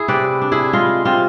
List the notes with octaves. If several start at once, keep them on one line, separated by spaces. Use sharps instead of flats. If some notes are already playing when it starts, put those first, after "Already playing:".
Already playing: E4 G#4
C3 B4 D5
D4
E4 G#4
G#3 F4
C3 F4